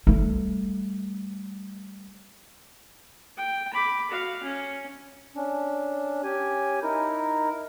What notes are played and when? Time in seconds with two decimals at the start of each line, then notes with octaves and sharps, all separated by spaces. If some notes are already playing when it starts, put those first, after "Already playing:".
0.07 G3 A3
3.37 G5
3.74 B5 D6
4.11 F#4 F5
4.43 C#4
5.36 C#4 D4
6.23 C#4 G4 G#5
6.83 D#4 E4 A#4